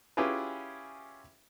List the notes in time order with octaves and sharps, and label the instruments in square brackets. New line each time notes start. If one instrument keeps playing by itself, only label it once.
[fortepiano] C#4 E4 F4 G4 G#4 B4